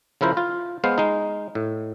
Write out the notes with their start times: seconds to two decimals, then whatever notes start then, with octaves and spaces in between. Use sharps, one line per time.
0.21 C#3 F3 E4 A#4 C5
0.37 F4
0.84 G#3 B3 C5 F5
0.98 G#3 D#4
1.55 A2